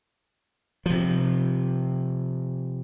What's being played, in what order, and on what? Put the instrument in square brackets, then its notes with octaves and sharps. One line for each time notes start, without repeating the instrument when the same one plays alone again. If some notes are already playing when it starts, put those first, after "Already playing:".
[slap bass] C3 F3